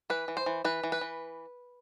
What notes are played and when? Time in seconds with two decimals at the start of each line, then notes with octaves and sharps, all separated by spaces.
0.10 E3 B4
0.28 E3
0.37 C5
0.46 E3
0.64 E3 B4
0.83 E3
0.92 B4
1.01 E3